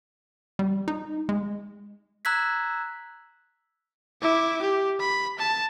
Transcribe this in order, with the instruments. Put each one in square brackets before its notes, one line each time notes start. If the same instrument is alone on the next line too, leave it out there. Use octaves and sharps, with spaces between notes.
[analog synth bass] G3
D#4
G#3
[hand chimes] A#5 E6 F#6 G#6 B6
[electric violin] E4 D6
G4
B5
A5